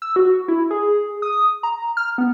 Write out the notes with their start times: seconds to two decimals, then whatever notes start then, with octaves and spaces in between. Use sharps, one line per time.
0.02 E6
0.16 F#4
0.48 E4
0.71 G#4
1.22 D#6
1.63 A#5
1.97 F6
2.18 B3